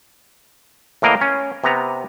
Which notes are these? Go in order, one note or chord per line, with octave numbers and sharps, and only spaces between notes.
A2 E3 A#3 A#4 D#5 F5
C#4
C3 B3 A#5